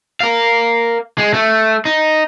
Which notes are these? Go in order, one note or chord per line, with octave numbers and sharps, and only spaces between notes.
A#4 F5
G#3
A3
D#4